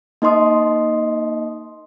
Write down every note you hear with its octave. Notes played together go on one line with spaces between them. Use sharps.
A#3 D#4 D#5 C6 D#6